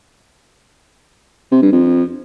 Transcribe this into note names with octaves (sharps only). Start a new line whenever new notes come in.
C3
G2
F2